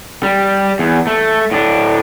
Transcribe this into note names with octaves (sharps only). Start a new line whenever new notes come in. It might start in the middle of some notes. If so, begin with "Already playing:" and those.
G3
E2
A3
A2 D4